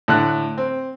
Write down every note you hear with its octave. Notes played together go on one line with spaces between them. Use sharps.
A2 D3 F#6
C4